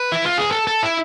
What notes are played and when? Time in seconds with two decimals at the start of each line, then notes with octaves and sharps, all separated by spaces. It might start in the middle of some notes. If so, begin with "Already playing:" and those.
Already playing: B4
0.12 E4
0.26 F4
0.38 G#4
0.51 A4
0.67 A4
0.83 E4